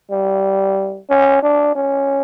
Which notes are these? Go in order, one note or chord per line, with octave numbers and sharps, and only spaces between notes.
G3
C#4
D4
C#4